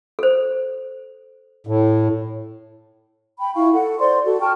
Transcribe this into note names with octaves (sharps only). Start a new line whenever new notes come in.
A4 C5
A2
G5 B5
E4 F4 F5 C#6
A4 F#5
C5 D5 C6
F#4 A4
G5 A5 C#6 F6